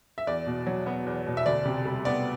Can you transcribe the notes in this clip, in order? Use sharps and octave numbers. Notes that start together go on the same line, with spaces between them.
E5
E2 D5
B2
F#3
B3
E2
B2
E5
D2 D5
C3
G3
B3 D5